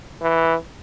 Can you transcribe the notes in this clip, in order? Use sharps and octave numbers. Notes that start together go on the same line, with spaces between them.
E3